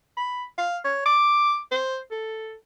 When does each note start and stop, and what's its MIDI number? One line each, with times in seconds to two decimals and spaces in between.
0.17 0.44 83
0.58 0.78 77
0.85 1.06 73
1.06 1.59 86
1.72 1.98 72
2.11 2.55 69